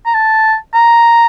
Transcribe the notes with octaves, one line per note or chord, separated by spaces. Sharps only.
A#5
A5
A#5